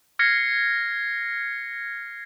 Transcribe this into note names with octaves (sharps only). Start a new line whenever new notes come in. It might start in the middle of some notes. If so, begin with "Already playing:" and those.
F6 G#6 A#6 C7 C#7